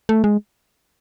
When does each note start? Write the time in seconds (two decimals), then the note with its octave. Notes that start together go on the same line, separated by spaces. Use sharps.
0.09 A3
0.24 G#3